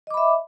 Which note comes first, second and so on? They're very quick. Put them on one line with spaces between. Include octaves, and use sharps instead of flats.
D#5 D6 B5 E5